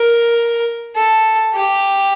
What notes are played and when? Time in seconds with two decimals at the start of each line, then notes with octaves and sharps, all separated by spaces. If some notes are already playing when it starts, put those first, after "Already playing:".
Already playing: A#4
0.96 A4
1.54 G4